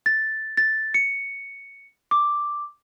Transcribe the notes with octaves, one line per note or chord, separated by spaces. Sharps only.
A6
A6
C#7
D6